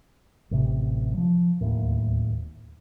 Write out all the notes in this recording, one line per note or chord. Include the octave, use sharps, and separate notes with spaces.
A1 C3
F3 F#3
D1 G#1 D#2 A2